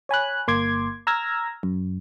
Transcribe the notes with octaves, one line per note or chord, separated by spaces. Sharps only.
C#5 G#5 B5 F#6
G1 A#3 C6 D6 G#6
A#5 E6 F6 G#6 A#6
F#2